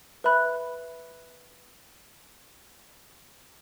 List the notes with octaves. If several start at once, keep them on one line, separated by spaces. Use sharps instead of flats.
B4 E5 B5 F#6